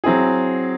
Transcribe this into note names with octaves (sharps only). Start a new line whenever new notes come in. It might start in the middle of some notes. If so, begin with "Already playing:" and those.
F#3 C4 E4 G#4